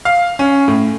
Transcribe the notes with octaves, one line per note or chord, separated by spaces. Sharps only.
F5
C#4
A2